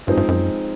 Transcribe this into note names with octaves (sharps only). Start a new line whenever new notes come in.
G2 F3 G#3 C4 D#4
G2
F#2